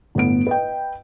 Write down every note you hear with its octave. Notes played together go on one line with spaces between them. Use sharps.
G1 A2 B3 D7
B4 D#5 G5